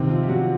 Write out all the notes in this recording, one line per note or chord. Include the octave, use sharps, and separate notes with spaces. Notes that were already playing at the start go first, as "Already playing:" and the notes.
Already playing: C3 D#3 C4
F3 F4
G4
F#3 F#4